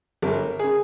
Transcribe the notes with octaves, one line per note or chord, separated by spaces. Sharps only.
G1 A#4
C#3 G#4